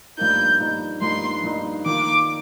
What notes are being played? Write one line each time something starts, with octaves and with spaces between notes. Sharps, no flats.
G2 F3 A#3 D#4 G6
G2 F3 A#3 D#4
G2 F3 A#3 D#4 C6
G2 F3 A#3 D#4
D#3 A#3 F4 D6